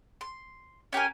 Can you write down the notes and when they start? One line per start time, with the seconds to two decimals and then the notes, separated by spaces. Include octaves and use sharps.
0.21 C6
0.93 C#4 G4 A#4 G#5